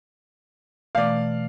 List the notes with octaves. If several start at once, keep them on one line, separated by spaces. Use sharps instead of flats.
B2 E3 A3 D5 F5